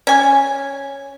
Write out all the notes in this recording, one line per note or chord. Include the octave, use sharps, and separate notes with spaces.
C#4 G#5